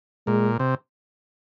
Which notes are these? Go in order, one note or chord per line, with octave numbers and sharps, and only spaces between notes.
A#2 G#3
C3